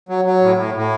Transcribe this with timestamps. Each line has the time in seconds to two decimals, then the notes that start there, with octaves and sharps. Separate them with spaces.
0.09 F#3
0.25 F#3
0.42 A2
0.57 A2
0.75 A2